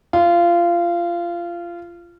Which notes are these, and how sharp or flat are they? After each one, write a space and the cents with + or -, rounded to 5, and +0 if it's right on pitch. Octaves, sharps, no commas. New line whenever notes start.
F4 -20